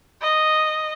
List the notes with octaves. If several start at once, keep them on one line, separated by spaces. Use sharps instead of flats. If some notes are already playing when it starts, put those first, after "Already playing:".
D#5